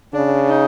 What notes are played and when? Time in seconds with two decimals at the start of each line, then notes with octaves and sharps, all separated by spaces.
0.14 C#3 D4
0.49 D#4